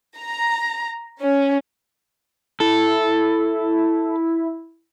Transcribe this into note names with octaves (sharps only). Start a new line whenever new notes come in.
A#5
C#4
E4 A4